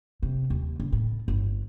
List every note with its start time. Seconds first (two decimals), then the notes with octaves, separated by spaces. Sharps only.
0.23 C3
0.50 D#2
0.80 C#3
0.92 A2
1.28 G1